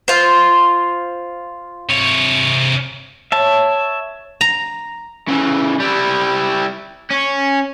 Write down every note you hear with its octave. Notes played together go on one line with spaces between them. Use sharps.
F4 C5
C3 C#5
C#5 E5 A5
A#5
C#3 E3
G3 E4
C#4